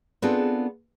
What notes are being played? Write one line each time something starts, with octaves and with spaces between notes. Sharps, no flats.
B3 C4 D4 F4 G#4 A4